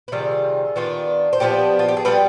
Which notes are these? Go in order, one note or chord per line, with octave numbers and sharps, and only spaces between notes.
B4
C3 D#3 G3 F4 G#4
D#3 B3 D4 F4
C5
F3 G#3 B3 D4 G4 B4
F4
G4
G#4
G3 B3 F4 G4 B4